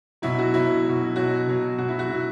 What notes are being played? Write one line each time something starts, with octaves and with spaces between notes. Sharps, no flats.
B2 F#3 E4
F#4
B2 F#3 E4
B2 F#3
B2 F#3 F#4
B2 F#3
B2 F#3 F#4
E4
F#4
B2 F#3 E4